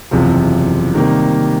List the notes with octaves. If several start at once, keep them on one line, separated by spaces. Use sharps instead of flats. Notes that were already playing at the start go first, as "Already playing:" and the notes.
F#1 E2 C3 F3
C3 D#3 G3 A#3